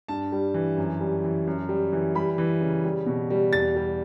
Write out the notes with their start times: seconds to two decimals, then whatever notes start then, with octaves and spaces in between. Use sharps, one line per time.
0.08 G2 A5
0.32 G3
0.54 E3
0.77 F#2
1.01 G3
1.24 E3
1.47 F#2
1.69 G3
1.92 E3
2.15 G3 B5
2.38 E3
2.61 C#3
2.84 G3
3.06 B2
3.30 G3
3.53 E2 A6
3.76 G3